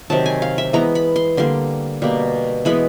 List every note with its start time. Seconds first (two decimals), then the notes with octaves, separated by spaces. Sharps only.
0.10 C3 D#3 F#3 A5
0.26 G#5
0.42 F5
0.58 E5
0.73 E3 G#3 B3 A#5
0.95 B5
1.16 C6
1.37 D3 G3 A#3 C6
2.02 B2 G3 A#3
2.65 E3 G#3 B3 B5